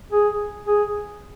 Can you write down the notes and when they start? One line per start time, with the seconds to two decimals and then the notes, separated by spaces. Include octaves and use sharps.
0.12 G#4
0.67 G#4